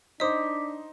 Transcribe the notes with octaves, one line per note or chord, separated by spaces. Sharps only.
D4 D#4 C5 D#5 D6 D#6 B6